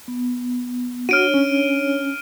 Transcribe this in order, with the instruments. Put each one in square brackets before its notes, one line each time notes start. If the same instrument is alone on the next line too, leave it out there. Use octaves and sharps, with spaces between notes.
[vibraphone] B3
[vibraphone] D4 C#5 [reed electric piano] F#4 [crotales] F6 D7 D#7
[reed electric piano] C#4